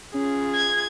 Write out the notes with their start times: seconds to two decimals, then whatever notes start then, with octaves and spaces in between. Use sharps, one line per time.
0.14 C#4 F4 G#4
0.55 G#6